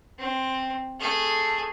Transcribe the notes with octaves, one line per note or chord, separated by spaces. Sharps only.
C4
A3 G#4